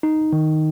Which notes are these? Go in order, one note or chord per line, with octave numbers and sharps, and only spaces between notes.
D#4
D#3